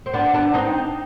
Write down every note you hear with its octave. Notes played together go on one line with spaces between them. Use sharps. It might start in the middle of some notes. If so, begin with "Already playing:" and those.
C4
B3 D4
B3 D4
C4 D#4